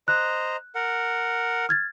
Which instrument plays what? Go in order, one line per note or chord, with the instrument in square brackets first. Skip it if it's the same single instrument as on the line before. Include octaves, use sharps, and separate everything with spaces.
[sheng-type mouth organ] C5 D#5 A#5 [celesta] F#6
[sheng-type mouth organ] A#4 F#5
[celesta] F6 G#6 A6